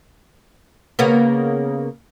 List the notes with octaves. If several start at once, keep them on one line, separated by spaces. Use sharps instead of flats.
C#3 A#3 B3